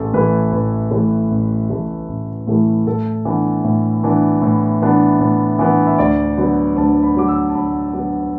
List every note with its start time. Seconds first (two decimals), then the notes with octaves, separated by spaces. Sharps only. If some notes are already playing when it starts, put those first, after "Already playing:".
Already playing: A1 A4
0.13 A2 E3 A3 E4 B4
0.52 A1 B4
0.91 A2 E3 A3 E4 A4
1.31 A1
1.70 A2 E3 A3 E4
2.09 A1
2.47 A2 E3 A3 E4
2.87 A2 A4
3.25 E3 B3 D4
3.64 A2
4.03 E3 B3 D4
4.42 A2
4.82 E3 B3 D4
5.20 A2
5.59 E3 B3 D4
5.87 E5
5.98 D2 D5
6.38 D3 F#3 B3
6.76 D2 A5
7.03 B5
7.15 D3 F#3 B3 D6
7.28 E6
7.50 A5
7.55 D2 B5
7.93 D3 F#3 B3